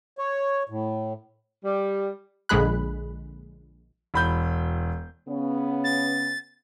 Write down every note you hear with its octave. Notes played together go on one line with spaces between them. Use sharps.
C#5
A2
G3
A#1 D3 G#3 G#4 B5 F#6
E1 B5 G6
C#3 B3 C#4
A6